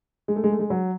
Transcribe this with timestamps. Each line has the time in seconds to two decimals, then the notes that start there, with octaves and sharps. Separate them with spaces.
0.28 G#3
0.36 A3
0.44 G#3
0.52 A3
0.59 G#3
0.70 F#3